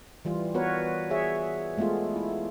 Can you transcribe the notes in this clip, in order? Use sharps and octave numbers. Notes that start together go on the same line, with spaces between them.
E3 G3 F4
B3 F#4 A#4 B4 C#5
G#4 C#5 E5
G#3 A3 B3 F4 G#4
E4